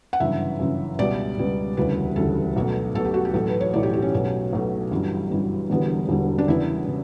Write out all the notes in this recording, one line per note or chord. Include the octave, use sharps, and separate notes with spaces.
F#5
G1 F#2 C#3 E3 E5
G1 F#2 C#3 E3
C#2 B2 G3 B3 D5
C#2 B2 G3 B3
E1 D2 C#3 E3 G3 B4
E1 D2 C#3 E3 G3 A4
B1 B2 A3
B1 B2 A3 A4
G4
F#4
G4
B1 A2 E3 A3 A4
B4
C#5
B1 A2 E3 A3 D5
G4
G4
C#4
B1 B2 A3
B1 B2 A3
G1 F#2 E3 G3
G1 F#2 E3 G3
E1 E2 D3 G3 B3
E1 E2 D3 G3 B3
D4
E2 C#3 G3 B3 E4
C#3